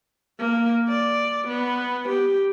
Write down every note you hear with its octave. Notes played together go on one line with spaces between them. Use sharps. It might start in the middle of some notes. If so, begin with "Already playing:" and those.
A#3
D5
B3
G4